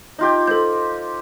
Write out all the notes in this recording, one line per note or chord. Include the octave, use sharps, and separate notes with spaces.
D#4 F4 G4
A4 C5 G6